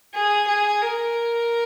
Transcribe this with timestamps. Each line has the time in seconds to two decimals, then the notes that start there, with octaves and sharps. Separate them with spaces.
0.14 G#4
0.48 G#4
0.82 A#4